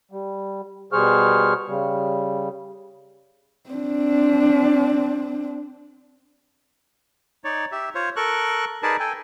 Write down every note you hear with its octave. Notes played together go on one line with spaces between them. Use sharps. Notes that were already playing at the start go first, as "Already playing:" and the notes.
G3
B2 G3 G#4 C5 C#6 F6
C#3 G3
C4 D4
D#4 C#5 D5
G4 E5
F4 C5 C#5
A4 A#4 C#6 F#6
D#4 G#4 A#4 B4 D5 A5
A4 G5 G#5